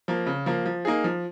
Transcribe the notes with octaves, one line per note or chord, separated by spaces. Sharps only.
F3 A#3
C#3
F3 A#3
F3
A#3 D#4 G#4
F3